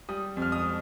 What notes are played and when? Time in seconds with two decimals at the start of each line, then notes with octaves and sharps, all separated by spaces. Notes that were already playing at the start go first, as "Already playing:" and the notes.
0.09 G3 D#6
0.37 F2
0.42 F6
0.52 D#6